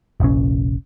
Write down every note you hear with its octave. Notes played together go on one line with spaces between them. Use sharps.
F1 A#1 C#4